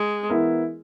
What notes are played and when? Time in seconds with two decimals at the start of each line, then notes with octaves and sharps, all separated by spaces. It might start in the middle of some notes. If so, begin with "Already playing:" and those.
Already playing: G#3
0.29 E3 B3 E4 A#4